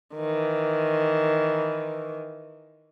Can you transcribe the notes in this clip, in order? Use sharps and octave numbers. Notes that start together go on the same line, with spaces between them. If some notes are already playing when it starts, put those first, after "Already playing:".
D#3 E3